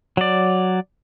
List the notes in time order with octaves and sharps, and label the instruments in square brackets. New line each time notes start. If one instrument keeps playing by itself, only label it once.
[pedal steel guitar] F#3 D5